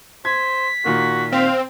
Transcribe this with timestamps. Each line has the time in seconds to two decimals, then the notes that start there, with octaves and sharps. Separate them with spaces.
0.25 C5 G#6 B6
0.85 A#2 D#3 A#3 F#4
1.33 C4 F5